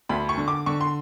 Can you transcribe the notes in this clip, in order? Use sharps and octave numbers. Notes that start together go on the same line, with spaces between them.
D2 B5
C#6
D3
D6
D3 C#6
C6